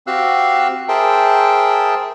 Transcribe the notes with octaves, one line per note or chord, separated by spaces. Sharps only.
C4 F#4 G4 F5 E6 F#6
G#4 A#4 C5 E5 G5 A5